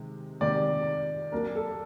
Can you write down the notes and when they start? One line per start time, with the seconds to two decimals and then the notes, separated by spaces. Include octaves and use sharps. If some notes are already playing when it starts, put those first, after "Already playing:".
Already playing: C3 D#3 G#3
0.41 C3 D#3 G#3 D5
1.32 F#3 A#3 D4 A#4
1.55 A4